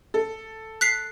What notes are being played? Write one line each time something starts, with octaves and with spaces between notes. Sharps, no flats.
A4
F#6 B6 C7